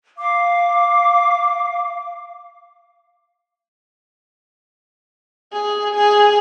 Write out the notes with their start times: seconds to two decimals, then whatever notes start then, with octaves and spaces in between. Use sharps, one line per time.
0.18 F5 D6
5.52 G#4
5.94 G#4